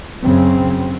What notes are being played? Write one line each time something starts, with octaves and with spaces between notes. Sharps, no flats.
F#2 C#3 C4